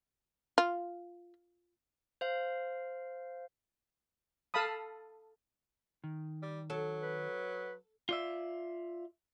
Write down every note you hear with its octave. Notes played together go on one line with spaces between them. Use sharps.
F4
C5 F5
A4 F5 A5 B5 D#6
D#3
G3
F#3 A4
B4
F4 D5 E5